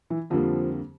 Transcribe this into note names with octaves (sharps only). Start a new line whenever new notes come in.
E3
F2 D3 F3 G3 A#3